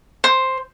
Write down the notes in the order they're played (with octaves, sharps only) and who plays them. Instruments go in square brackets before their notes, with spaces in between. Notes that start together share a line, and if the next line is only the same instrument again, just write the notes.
[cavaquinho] C5